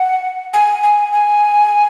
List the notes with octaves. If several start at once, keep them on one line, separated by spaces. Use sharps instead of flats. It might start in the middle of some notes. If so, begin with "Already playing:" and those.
Already playing: F#5
G#5
G#5
G#5